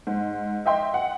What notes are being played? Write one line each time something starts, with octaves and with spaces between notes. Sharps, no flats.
G#2
D#5 E5 G5 C6
F#5